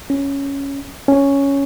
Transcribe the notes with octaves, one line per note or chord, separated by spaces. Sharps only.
C#4
C#4